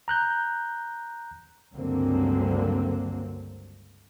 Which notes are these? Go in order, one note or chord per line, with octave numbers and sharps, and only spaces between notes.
A#5 F#6 G6
C#2 G2 D3 F#3 A#3 C4